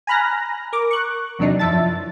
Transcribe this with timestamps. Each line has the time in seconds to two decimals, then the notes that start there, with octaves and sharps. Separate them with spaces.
0.07 G#5 A#5 B5 F6 F#6 A#6
0.73 A#4 D6
0.91 C#6 F#6
1.39 E2 C3 F#3 D4 D#4
1.59 F#2 F3 E4 E5 A5 A6